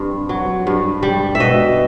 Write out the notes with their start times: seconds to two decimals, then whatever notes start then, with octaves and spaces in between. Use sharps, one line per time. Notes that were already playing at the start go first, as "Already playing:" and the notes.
Already playing: G2 C4
0.29 F#3
0.67 G2
1.03 G3
1.35 E5
1.40 B2 D#5